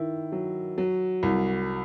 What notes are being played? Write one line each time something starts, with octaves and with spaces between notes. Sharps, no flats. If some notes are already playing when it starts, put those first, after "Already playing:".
Already playing: D#3 E4
F#3
F#3
C2